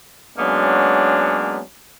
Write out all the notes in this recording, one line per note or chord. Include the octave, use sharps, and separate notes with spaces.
F#3 G#3 A#3 B3 C#4 D4